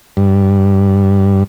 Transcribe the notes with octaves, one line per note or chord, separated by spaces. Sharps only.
G2